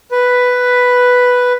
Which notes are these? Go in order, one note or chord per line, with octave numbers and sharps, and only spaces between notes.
B4